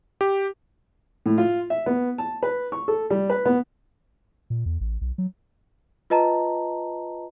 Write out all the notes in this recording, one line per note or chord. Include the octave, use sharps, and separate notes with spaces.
G4
A2
F4
E5
B3
A5
B4
C#6
A4
G3
B4
B3
A#2
E2
A1
B1
F#3
F4 B4 D#5 A5 A#5